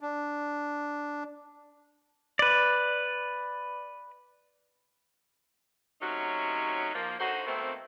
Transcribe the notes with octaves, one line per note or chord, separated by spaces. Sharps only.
D4
B4 D5
C3 F#3 A3 C#4 D#4 F#4
F3 A#3
D3 D#4 F#4 C5
B2 D#3 A3 A#3 C4